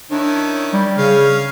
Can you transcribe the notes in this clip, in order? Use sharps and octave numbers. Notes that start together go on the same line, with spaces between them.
D#3 C#4 D4 E4
G3
C#3 C#4 F5